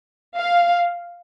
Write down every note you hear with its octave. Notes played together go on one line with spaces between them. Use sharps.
F5